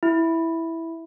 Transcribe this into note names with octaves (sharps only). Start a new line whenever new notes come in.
E4